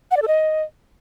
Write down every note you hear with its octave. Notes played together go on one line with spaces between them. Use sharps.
F#5
D5
A4
D#5